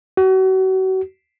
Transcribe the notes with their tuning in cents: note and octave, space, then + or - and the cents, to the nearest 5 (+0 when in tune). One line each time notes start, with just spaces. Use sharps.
F#4 +35